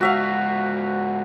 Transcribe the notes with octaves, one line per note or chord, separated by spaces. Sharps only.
G#2 F4 F#4 E5 F5